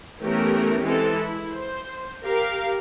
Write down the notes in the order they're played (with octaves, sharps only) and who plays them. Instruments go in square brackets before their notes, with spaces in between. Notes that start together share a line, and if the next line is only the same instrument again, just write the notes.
[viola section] E3 A3 B3 C#4 G4 A#4
E3 G#3 C4 A4
E4
C5
G4 A#4 F5